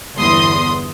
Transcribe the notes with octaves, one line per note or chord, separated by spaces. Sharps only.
G1 E2 C6 D#6